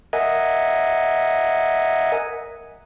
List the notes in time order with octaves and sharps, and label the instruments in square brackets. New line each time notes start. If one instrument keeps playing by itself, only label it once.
[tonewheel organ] A#4 D#5 E5 F#5 G#5